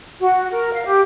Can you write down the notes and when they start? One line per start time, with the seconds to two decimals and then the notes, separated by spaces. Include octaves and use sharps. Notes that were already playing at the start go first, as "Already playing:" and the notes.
0.20 F#4
0.51 A#4
0.72 F5
0.85 G4